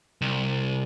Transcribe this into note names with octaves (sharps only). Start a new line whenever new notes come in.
C2